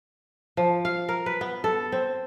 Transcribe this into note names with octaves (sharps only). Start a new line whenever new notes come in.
F3
F5
A#4
B4
B3
A4
C4